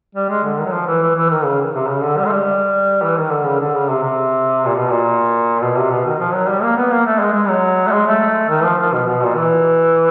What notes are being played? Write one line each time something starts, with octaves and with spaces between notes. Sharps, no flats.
G3
G#3
D3
D#3
F#3
F3
E3
E3
E3
D#3
C#3
C3
C#3
D3
G3
G#3
G3
E3
D#3
D3
C#3
D3
C#3
C3
C3
A#2
B2
A#2
B2
C3
B2
D#3
F3
F#3
G3
A#3
B3
A#3
A3
G#3
G#3
F#3
A3
G#3
A3
D#3
F3
F3
B2
B2
A#2
E3